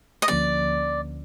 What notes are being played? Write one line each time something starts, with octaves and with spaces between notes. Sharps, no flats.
D#5
D2 D3 F3 A#3 C#4 D5